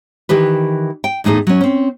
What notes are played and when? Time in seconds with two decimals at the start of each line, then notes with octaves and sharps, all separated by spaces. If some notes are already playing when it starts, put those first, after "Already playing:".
0.29 D#3 E3 G4 B4
1.04 G5
1.24 E2 A2 D#4 G#4 A4
1.47 F#3 C#4
1.61 C4 C#4